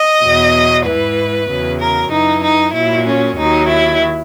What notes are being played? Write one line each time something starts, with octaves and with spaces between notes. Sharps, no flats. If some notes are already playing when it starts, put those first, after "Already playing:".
Already playing: D#5
E2 B2 F#3
G#2 E3 B4
E2 C#3 F#3
A#4
F#2 E3 D#4
D#4
A#2 F#3 E4
C#4
D#2 D#3 F#3 D#4
E4